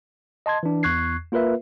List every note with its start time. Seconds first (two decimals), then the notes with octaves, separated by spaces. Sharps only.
0.46 D#5 A5 C6 G#6
0.63 E3 D4
0.83 E2 C#6 F#6 G#6 C7
1.32 A#3 F4 A#4 B4 E5